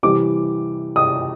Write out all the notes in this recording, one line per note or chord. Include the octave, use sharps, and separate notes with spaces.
C3 E3 G3 D6
D#6